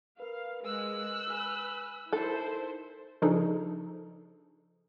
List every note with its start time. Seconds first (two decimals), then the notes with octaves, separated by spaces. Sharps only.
0.20 A#4 B4 F5
0.64 G#3 E6 F#6
1.30 B4 G#5
2.13 D#4 E4 A4 A#4 C5
3.22 C#3 F3 D4 D#4 G#4 A4